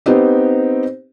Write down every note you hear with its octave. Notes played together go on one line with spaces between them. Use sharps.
B3 C4 D#4 G4